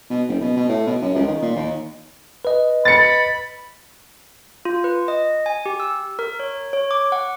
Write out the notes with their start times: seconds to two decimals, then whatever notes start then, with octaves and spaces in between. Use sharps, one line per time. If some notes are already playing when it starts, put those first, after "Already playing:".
0.10 B2
0.28 F#1
0.41 B2
0.57 B2
0.69 A2
0.87 B2
1.02 F#2
1.15 C#2
1.27 D#3
1.42 A#2
1.56 D#2
2.45 B4 D#5
2.85 B5 A6 C#7
4.65 F4
4.84 B4
5.08 D#5
5.46 G#5
5.66 G4
5.80 E6
6.19 A#4
6.40 C#5
6.73 C#5
6.91 D6
7.12 F#5